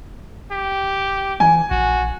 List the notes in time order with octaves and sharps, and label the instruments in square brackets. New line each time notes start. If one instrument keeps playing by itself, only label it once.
[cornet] G4
[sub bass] E3 [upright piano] G#5
[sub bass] A#1 [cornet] F#4